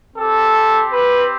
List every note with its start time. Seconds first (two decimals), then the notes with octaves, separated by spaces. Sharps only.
0.16 C4 G4 A4
0.90 B4